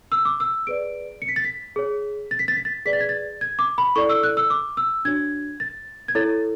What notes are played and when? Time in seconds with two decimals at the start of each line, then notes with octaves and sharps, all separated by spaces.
0.12 E6
0.25 D6
0.40 E6
0.67 G#4 B4 D5 D7
1.22 C#7
1.29 B6
1.36 A6
1.44 B6
1.76 G#4 C#5
2.31 A6
2.39 B6
2.48 A6
2.56 B6
2.65 A6
2.86 G#4 B4 D5 B6
2.93 A6
3.00 G#6
3.09 A6
3.41 G#6
3.59 D6
3.78 B5
3.96 E4 A4 D5 C#6
4.09 E6
4.23 F#6
4.37 E6
4.50 D6
4.77 E6
5.05 D4 F#4 C#5 G#6
5.60 A6
6.08 G#6
6.15 E4 A4 C#5 A6